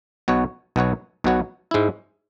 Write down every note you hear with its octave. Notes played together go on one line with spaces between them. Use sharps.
B1 B2 B3 F#4 C#5
B1 B2 B3 F#4 C#5
B1 B2 B3 F#4 C#5
G#2 G#3 E4